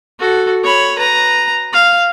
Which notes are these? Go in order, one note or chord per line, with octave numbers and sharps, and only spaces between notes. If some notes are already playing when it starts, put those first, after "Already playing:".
F#4 A4
C#5 B5
B4 A#5
F5